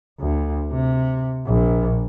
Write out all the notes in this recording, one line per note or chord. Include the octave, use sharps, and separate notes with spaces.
D2
C3
A#1